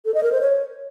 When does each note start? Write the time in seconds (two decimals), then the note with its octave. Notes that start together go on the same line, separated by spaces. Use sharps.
0.05 A4
0.14 D#5
0.23 A#4
0.32 C5
0.41 C#5